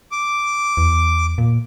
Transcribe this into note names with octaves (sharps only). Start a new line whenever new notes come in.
D6
E2
A#2